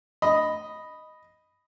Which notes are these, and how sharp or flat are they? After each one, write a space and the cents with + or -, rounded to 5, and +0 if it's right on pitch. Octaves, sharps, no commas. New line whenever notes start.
D#5 +0 B5 +0